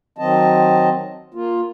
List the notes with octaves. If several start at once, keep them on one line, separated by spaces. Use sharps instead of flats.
D#3 F#3 C4 D#5 A5
A#3 F4